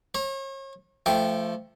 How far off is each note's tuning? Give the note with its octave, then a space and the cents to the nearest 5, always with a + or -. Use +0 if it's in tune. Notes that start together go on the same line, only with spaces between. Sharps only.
C#5 -40 A#5 +15
F3 -20 A3 +0 G5 +0